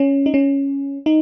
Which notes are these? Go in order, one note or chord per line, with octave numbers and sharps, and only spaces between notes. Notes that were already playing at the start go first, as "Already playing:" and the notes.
Already playing: C#4
D#4
C#4
D#4